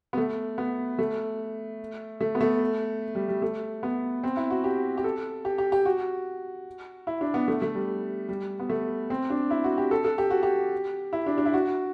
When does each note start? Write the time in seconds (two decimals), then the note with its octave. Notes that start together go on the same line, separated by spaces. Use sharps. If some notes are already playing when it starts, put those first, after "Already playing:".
0.13 B3
0.17 A3
0.58 B3
0.99 A3
2.20 A3
2.35 B3
2.41 A3
3.15 G3
3.28 G3
3.42 A3
3.83 B3
4.24 C4
4.37 E4
4.50 F#4
4.64 G4
4.98 G4
5.04 A4
5.45 G4
5.58 G4
5.72 G4
5.85 F#4
7.07 E4
7.21 D4
7.34 B3
7.48 A3
7.62 A3
7.75 G3
8.29 G3
8.60 B3
8.69 A3
9.10 C4
9.30 D4
9.51 E4
9.64 F#4
9.78 G4
9.91 A4
10.04 A4
10.18 G4
10.30 F#4
10.43 G4
11.13 E4
11.26 D4
11.38 D4
11.46 E4
11.54 F#4